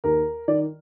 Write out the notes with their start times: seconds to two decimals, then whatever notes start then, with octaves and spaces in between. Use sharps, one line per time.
0.04 D#2 A#4
0.48 D#3 D5